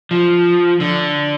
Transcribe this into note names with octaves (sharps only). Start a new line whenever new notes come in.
F3
D3